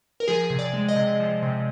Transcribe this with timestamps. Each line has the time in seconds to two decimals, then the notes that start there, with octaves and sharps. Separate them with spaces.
0.20 A#4
0.28 F3 G#4
0.50 C3
0.59 D5
0.73 G#3
0.89 D#5
0.96 C3
1.20 F3
1.42 C3